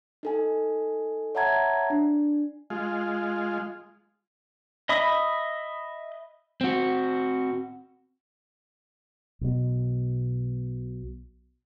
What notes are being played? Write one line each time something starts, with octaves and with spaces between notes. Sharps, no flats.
D#4 A4 G#5
C#5 E5 F#5 A5 A#5 G#6
D4
G#3 F4
D#5 E5 B5 D#6
C4 F#4
B1 B2